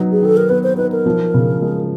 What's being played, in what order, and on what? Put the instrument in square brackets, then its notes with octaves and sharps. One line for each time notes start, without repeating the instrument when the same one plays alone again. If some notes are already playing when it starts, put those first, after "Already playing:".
Already playing: [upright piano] F#3 B3 D#4
[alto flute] G#4
[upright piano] D#3 [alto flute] A4
[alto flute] A#4
[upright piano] B3 [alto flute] B4
[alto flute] C5
[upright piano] D#4 [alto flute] B4
[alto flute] A#4
[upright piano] F3
C#3
G#3